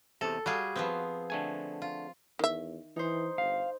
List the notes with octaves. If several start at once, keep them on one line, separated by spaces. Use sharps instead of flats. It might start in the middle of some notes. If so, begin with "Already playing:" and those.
E2 C3 A4
G3 F#4 G#4 F5
F3 B3 C4
D3 A3 G#5
F4
E2 D#3 E5
E3 D#4 C5
G1 F5